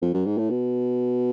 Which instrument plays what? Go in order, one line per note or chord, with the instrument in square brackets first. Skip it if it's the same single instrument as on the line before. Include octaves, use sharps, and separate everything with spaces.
[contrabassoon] F2
F#2
G#2
A2
B2